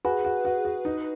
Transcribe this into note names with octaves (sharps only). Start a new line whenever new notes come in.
F#4 G#4 B4
F#4
F#4
F#4
D#4